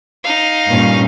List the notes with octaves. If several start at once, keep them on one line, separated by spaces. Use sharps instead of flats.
D#4 F5
G2 A#2 C#4